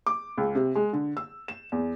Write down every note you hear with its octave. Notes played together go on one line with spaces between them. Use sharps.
D6
C#2
C3
G#3
D3
E6
E7
E2